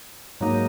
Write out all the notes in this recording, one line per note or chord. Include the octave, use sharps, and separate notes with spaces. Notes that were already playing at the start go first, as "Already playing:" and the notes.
G#2 F#3 A#3 D#4